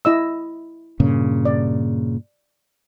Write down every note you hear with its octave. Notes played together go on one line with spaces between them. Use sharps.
E4 D#5 E6
G2 A#2 C#3
D5